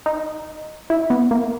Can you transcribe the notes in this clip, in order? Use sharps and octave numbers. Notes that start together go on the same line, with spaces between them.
D#4
E4
B3
A#3